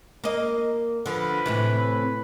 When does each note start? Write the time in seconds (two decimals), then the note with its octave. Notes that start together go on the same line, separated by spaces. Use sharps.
0.24 A#3 D#5
1.06 D3 F3 B4
1.46 A2 C3 E3